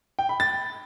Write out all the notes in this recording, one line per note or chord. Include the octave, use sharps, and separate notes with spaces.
G5
B5
A6